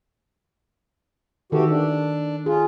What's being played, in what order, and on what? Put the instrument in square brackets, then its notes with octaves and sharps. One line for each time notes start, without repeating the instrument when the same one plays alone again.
[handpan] D#3 A4 [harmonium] E3 F#4 G4
[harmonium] D4
[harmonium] F4 [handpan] G#4